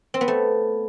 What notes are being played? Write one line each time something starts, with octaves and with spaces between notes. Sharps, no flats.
C4
B3
A3